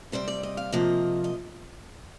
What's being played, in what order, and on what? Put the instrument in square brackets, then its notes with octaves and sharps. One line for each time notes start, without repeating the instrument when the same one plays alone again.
[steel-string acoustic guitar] C3 G3 C4 C5
D5
D#5
F5
C3 F3 A#3 D#5
D#5